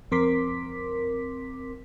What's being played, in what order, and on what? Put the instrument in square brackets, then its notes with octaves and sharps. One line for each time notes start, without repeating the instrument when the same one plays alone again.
[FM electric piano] F2 C4 A#4 C6 D6 B6